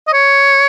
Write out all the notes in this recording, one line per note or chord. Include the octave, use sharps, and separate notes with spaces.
D#5
C#5